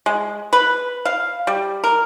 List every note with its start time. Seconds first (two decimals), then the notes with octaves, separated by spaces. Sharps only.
0.06 G#3
0.53 B4
1.05 F5
1.47 G3
1.84 A#4